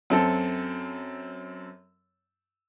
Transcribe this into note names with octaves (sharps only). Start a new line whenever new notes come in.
F#2 C4 A4